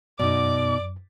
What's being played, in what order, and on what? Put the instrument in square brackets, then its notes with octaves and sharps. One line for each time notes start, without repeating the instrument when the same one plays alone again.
[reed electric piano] F#2 [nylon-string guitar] B2 D#4 [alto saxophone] D5 [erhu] D6